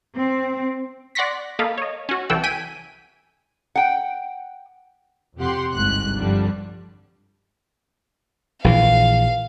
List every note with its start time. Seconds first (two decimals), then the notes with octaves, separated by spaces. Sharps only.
0.17 C4
1.15 D5 F#5 C6 C#6 A#6 B6
1.59 A#3 A4 D#5 F5 B5
1.78 C#5 D#5
2.09 C#4 F#4
2.30 C2 E3 A4 F#5 G5 E6
2.44 G5 G#5 B6 D7 D#7
3.76 F#5 G5
5.37 F2 C3 G4 F#5 C6
5.74 G1 C2 G#2 F#6
6.18 G2 D3 F3 G3 D4
8.64 A#1 E3 F5